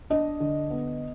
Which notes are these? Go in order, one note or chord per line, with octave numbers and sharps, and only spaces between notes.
D4 D#5
D3
B3